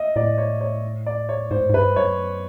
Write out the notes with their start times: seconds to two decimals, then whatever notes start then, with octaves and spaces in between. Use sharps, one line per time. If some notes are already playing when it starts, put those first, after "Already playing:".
Already playing: D#5 E5
0.16 A2 D5
0.38 C#5
0.61 C#5
1.06 D5
1.29 C#5
1.51 G#2 C5
1.70 G#2
1.74 G2 B4
1.96 F#2 C#5